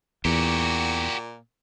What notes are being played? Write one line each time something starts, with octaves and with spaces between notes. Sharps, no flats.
E2 A#2 F#4 G4